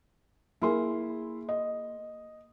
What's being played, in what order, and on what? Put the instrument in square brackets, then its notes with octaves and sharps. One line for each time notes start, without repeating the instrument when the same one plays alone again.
[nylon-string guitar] A#3 G#4 [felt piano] E4 C6
[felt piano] D#5